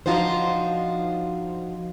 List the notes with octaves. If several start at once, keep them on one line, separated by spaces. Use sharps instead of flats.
F3 D4 D#4 F4 F#4 C5